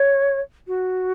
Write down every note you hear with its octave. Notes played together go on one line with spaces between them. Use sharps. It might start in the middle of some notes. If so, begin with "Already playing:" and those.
Already playing: C#5
F#4